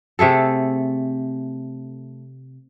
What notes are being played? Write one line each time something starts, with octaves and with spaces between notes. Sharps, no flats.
C3 A3 G#4 A4